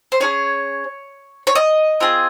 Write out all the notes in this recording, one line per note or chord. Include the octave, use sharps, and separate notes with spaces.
C5
C#4 F4 G#4 C#5
C#5
D#5
C4 F4 G#4